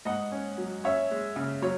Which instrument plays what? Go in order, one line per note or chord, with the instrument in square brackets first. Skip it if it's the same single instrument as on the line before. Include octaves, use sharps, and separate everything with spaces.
[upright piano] G#2 D#5 F#5
C#4
F#3
C#4 C#5 E5
G#3
C#3
F#3 C#5